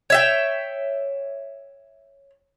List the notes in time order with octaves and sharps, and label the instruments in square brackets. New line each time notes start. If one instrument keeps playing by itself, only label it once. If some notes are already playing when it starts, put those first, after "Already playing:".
[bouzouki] C#5 E5 G5